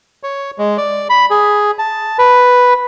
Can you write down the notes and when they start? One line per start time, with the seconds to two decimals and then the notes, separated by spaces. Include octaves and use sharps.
0.23 C#5
0.58 G#3
0.78 D5
1.10 B5
1.30 G#4
1.79 A5
2.19 B4